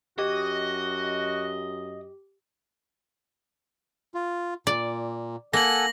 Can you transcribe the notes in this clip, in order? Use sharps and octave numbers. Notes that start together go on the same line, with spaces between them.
F#2 F#4 G4 D#5
F4
A#2 D5
A#3 A4 F#5 G#5 A#6 F#7